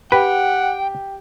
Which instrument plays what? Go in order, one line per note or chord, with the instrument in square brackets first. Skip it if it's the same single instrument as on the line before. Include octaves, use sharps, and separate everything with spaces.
[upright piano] G4 [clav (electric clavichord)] B4 [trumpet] F#5 [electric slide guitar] G5